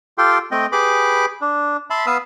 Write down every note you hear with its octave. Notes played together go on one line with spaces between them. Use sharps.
F4 G4 A4 G5 C6
A3 C4 D#5 G5
G4 G#4 B4 B5 D6
D4
E5 A5 B5 C6
B3 B4 F5 D#6 E6